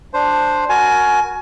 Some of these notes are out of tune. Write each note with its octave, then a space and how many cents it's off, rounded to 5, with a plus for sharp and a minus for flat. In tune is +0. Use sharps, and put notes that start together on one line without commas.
D4 +0 C5 +0
F#4 +0 A#4 +0 G#5 +25